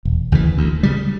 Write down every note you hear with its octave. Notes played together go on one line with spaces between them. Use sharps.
E1
D2 C#3 E3
D2
C#3 G3